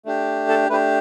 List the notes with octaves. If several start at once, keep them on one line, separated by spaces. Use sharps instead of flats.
A3 D4 G4
A4
A3 D4 G4 B4